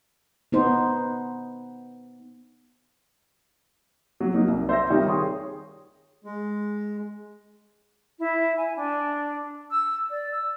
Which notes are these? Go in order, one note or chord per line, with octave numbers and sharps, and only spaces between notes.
B3 D#4 C5
F#3
F#3 A#3 D#4
C2
C5 E5 G6 A#6
D#3 G3 D#4 F4 C#5
G#4 C#5 G5 C6 D#6
G#3
E4
G#5
D4
E6
D5
E6